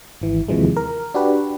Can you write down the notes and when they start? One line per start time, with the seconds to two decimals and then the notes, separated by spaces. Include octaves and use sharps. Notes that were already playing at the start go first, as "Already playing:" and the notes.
0.22 G#1 E3
0.48 D#2 C3 E3 F3 G#3
0.77 A#4
1.14 D4 F#4 G4 B4